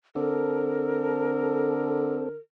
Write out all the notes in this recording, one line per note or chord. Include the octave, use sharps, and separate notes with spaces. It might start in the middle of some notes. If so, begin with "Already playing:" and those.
D3 C4 A4 A#4